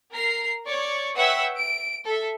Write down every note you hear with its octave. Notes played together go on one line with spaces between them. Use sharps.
A#4 A#5 C7
C#5 D5 C#6
B4 C#5 E5 F#5 G5 E6
D7
A4 E5